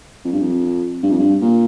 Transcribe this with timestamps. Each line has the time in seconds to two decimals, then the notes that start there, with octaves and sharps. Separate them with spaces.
0.25 F2
0.33 G2
0.41 F2
1.03 G2
1.11 F2
1.19 G2
1.41 A#2